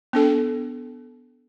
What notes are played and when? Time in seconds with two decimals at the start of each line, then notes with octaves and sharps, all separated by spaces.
0.13 B3 D4 A4